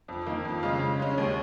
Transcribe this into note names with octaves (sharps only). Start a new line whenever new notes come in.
F2
D#3 A#3
F2
C#3 G#3 F4
C#3
G#3 C#4
D#2